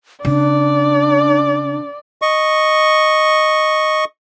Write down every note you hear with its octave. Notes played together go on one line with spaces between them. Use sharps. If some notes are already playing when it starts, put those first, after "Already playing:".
C#3 D4 D5
D#5 C#6